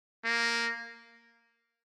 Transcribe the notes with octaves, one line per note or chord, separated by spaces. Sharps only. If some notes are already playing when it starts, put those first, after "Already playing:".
A#3